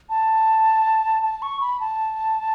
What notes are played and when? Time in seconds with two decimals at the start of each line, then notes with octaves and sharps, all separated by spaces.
0.10 A5
1.23 A5
1.42 C#6
1.61 B5
1.80 A5